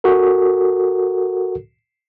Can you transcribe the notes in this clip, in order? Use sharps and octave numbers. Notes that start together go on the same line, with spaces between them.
F#4 A4 A#4